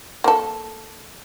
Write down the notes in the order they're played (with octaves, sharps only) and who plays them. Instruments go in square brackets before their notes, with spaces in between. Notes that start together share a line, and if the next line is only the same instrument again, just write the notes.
[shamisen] A#3 A4